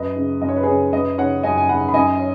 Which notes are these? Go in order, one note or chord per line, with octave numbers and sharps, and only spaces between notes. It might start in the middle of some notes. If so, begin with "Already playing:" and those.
Already playing: F#2 B4 D#5
C#3
F#2 D#5
C#5
B4
C#3 G#4 C#5
F#2 B4 D#5
C#3 C#5 F#5
F#2 D#5 G#5
G#5
C#3 F#5 B5
B5
F#2 D#5 G#5
C#5